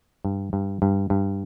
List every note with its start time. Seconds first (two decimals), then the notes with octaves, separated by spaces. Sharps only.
0.25 G2
0.53 G2
0.82 G2
1.10 G2